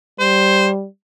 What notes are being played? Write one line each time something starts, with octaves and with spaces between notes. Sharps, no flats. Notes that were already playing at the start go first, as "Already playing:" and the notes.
G3 C5